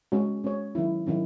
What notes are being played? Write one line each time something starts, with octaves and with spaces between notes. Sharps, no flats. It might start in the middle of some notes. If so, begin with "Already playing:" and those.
G#3 C#4 F#4 C#5
G#3 C#4 F#4 C#5
D#3 F#3 C#4 E4
D#3 F#3 C#4 E4